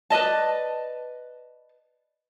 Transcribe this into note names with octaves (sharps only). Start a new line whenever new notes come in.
B4 D5 D#5 A5